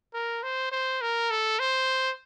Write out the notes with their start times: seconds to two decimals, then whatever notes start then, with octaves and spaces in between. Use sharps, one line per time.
0.14 A#4
0.43 C5
0.72 C5
1.01 A#4
1.31 A4
1.59 C5